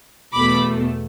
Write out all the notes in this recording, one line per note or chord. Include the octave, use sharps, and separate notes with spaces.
E2 B2 A3 B5 D6